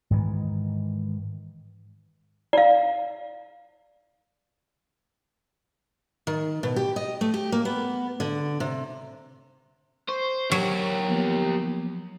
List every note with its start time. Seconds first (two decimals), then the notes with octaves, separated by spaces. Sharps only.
0.11 G#2 D#3 E3
2.53 D5 F5
6.27 D#3
6.63 B2
6.76 G4
6.96 D#5
7.21 A3
7.34 G4
7.52 A#3
7.65 B3
8.20 D3
8.60 C3
10.09 C5 C#6
10.51 F#3 G4 A#4
11.08 F3 A#3 B3